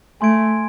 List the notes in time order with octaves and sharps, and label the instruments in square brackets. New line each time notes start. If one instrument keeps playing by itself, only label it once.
[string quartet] A3 [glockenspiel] G#5 C6 G#6 D7